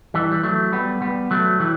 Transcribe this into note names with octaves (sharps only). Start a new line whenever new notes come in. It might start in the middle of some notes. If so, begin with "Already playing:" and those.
E3 G3
G3
F#3 A3
G3 B3
G3 B3
F#3 A3
E3 G3